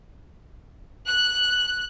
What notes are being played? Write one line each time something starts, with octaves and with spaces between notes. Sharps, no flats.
F#6